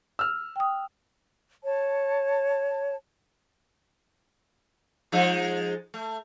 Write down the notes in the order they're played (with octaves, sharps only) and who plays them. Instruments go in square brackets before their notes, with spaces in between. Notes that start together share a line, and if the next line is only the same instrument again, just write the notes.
[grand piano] E6 F6
[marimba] G5 D#6
[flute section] C#5 A5
[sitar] F3 G#3 D#4
A3